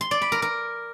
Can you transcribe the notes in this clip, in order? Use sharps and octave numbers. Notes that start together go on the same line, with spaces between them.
C6
D5
B5
A#4
A#4